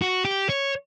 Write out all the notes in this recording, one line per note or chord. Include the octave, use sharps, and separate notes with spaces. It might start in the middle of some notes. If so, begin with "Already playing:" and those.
F#4
G4
C#5